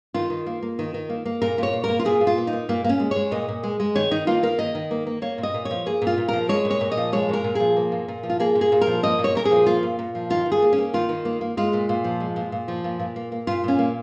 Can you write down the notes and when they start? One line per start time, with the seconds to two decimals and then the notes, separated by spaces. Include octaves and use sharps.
0.14 D#3 F4
0.30 D#3
0.46 A#3
0.62 A#3
0.79 D#3
0.94 D#3
1.09 A#3
1.25 A#3
1.41 A#2 A#4
1.58 A#2 C#5
1.73 A#3
1.84 A#3 A#4
1.99 F4
2.05 A#2 G#4
2.21 A#2
2.27 F4
2.37 A#3
2.47 D#4
2.53 A#3
2.69 A#2 A#3
2.84 A#2 A#3
2.89 C#4
3.00 G#3
3.11 G#3 C#5
3.31 A#2 D#5
3.48 A#2
3.63 G#3
3.80 G#3
3.95 D#3 C#5
4.11 D#3 D#4
4.27 A#3 F4
4.43 A#3 A#4
4.59 D#3 D#5
4.75 D#3
4.91 A#3
5.07 A#3
5.22 A#3 C#5
5.38 A#2
5.43 D#5
5.54 A#2
5.65 C#5
5.71 F3
5.86 A#3 G#4
6.02 A#2
6.07 F4
6.18 A#2
6.28 F3 A#4
6.49 G#3 C#5
6.65 A#2
6.70 C#5
6.81 A#2
6.92 D#5
6.97 F3
7.13 G#3 C#5
7.29 A#2 A#4
7.44 A#2
7.55 F3 G#4
7.77 A#3
7.92 A#2
8.08 A#2
8.23 F3
8.30 F4
8.40 A#3 G#4
8.55 A#2
8.61 G#4
8.72 A#2
8.81 A#4
8.87 F3
9.03 A#3 D#5
9.19 A#2
9.24 C#5
9.35 A#2 A#4
9.45 G#4
9.51 F3
9.66 A#3 F4
9.83 A#2
9.99 A#2
10.15 F3
10.30 D#3 F4
10.46 D#3
10.52 G#4
10.62 A#3
10.73 C#4
10.78 A#3
10.94 D#3 F4
11.09 D#3
11.25 A#3
11.41 A#3
11.57 G#3 F4
11.73 A#2
11.89 A#2
12.04 F3
12.20 G#3
12.36 A#2
12.52 A#2
12.68 F3
12.84 A#2
13.00 A#2
13.16 A#3
13.32 A#3
13.47 A#2 F4
13.64 A#2 C#4
13.79 A#3